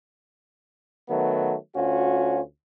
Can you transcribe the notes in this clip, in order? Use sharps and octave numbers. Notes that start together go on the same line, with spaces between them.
D#3 F#3 A3 B3
D2 C#4 F4 F#4